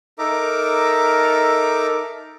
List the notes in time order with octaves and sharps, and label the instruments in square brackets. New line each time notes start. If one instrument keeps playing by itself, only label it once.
[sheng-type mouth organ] D#4 A4 A#4 E5 A#5 D6